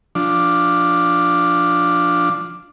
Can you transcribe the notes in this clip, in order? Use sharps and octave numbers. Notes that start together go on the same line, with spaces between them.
F3 D4